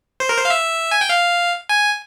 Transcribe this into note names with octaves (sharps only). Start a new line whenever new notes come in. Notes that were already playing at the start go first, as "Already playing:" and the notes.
C5
A#4
C5
F5
E5
G#5
G5
F5
G#5